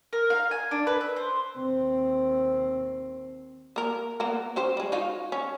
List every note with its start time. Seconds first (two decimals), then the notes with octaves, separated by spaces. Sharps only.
0.13 A#4
0.30 F5
0.51 G#5
0.71 D4
0.87 B4
1.01 E5
1.16 C5
1.58 D#2 C4
3.76 A#3 A#4
4.20 A#3 B3 A#4
4.56 C#4 G4 C5
4.77 G3 G#3
4.92 D#4 F4 F#4
5.32 C#4